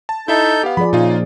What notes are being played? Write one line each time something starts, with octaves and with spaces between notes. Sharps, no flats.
A5
D#4 E4 A4 E5 G6
B3 G4 F5
F3 G#4 D5 B5
A#2 C#3 D#4 F4 G#4